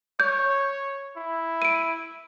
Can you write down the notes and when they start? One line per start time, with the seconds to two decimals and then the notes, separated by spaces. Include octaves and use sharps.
0.20 C#5 G6
1.16 E4
1.62 D7 D#7